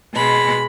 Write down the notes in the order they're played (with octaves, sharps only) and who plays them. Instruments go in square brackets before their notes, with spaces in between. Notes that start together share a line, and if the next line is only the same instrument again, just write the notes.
[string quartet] B2 G#3 B5